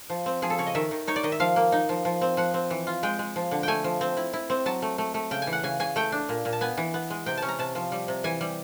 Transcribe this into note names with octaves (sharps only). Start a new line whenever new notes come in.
F3
C4
F3 G#4
A4
C#3 C#5
D#5
D#3 E5
D#3
D#4 C#5
D5
D#3 D#5
E5
F3 F5
A#3
D#4
F3
F3
C4
F3 F#5
C4
E3
F4
G#3 G5
G#3
F3
D3
A3 G5 G#5
F3
C4
E4
E4
C4
F#3 A5
A3
A3
A3
C#3 G5
G#5
E3
F#5
C#3 G#5
C#3 G#5
A3 G5
D4
A#2
A#2
A5
B3 G#5
E3
B3
G#3
C3 G5
C#4 A5
A#5
C3 A5
F3
G3
C3
E3 G#5
G3